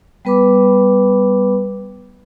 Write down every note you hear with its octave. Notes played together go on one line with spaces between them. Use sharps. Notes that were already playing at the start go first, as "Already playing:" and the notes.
G3 B3 B4 B5 D6